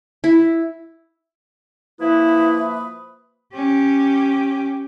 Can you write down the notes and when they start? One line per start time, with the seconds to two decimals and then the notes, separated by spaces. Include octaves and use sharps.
0.24 E4
2.01 F3 A#3 E4 B4 E5 D#6
3.54 C#4 G4